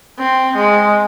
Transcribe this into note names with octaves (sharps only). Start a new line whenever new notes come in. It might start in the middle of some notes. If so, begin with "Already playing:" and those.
C4
G#3